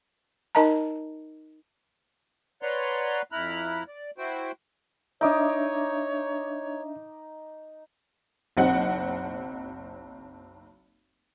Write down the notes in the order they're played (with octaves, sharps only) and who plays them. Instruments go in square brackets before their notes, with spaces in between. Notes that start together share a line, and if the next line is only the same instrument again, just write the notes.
[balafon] D#4 A#4 D#5 A5 A#5
[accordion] B4 C#5 D5 F#5 A#5 C6
F2 E4 A#5 B5 F6 F#6
D5
E4 F#4 C5 G5
[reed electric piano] D4 E5 [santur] D#4 D6 D#6 [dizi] C#5
[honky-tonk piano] F#1 B1 C4 D#5 F#5